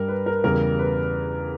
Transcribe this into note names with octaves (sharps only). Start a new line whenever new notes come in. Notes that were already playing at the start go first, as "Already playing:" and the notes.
Already playing: G2 G3 A#4
B4
A#4
E2 C#3 G3 A#4
B4